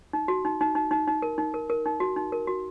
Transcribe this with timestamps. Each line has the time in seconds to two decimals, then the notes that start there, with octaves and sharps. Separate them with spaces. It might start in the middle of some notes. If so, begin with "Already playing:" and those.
0.13 D#4
0.28 F#4
0.45 D#4
0.61 D#4
0.75 D#4
0.91 D#4
1.07 D#4
1.22 A#4
1.38 D#4
1.54 A#4
1.70 A#4
1.86 D#4
2.00 F#4
2.16 D#4
2.32 A#4
2.47 F#4